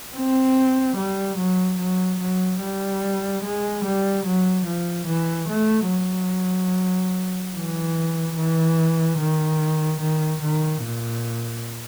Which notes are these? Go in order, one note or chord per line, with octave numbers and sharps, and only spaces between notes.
C4
G3
F#3
F#3
F#3
G3
G#3
G3
F#3
F3
E3
A3
F#3
E3
E3
D#3
D#3
D#3
A#2